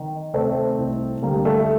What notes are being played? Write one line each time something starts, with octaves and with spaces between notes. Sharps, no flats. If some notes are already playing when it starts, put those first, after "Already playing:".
Already playing: D#3
C3 A3 C4
C2
D3 G3 A#3
A3